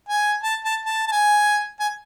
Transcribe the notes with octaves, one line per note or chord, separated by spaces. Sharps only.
G#5
A5
A5
A5
A5
G#5
G#5